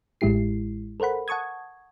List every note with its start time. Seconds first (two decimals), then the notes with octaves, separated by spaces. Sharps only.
0.21 A1 A2 G#3 E4 G4 C7
1.00 A4 A#4 C5 F#5 B5
1.28 F#5 A5 C#6 D#6 G#6